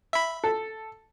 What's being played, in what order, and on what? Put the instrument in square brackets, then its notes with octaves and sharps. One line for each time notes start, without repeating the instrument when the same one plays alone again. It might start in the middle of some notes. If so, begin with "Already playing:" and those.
[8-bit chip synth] E5 B5
[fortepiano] A4